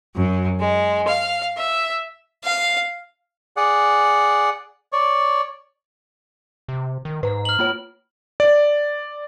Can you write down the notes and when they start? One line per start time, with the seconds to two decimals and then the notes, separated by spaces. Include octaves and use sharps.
0.17 F#2
0.59 G#3
1.07 F5
1.57 E5
2.44 F5
3.57 G#4 D5 F#5
4.93 C#5 D5
6.68 C3
7.05 D#3
7.23 G#2 B4 A#5
7.45 F6 F#7
7.59 A#3 F4 C#5
8.40 D5